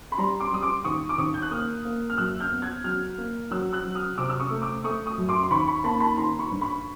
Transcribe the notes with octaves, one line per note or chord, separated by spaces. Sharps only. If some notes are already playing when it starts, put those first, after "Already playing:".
B5
G3 A#5 C6
C6 D6
G3 D#6
C6 D6
D#2 C#6 D#6
D6
D#2 C#6 D#6
G6
F#6
A#3 D#6 F6
A#3
F6
F#2 E6 F#6
F6 G6
B3
F#6 G#6
F#3 F6 G6
A#3
F#3 E6 F#6
E6 F#6
F#3
D#6 F6
C3 D6 E6
E6
C#6 D#6
A3
D6 E6
A3 C#6 D#6
C#6 D#6
F#2
C6 D6
C6
D#2 B5 C#6
B5 C#6
A#3 A5 B5
A5 B5
D#3 A#5 C6
B5 C#6
G2
B5 C#6